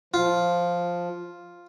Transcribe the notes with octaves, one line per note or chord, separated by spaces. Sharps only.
F3 F4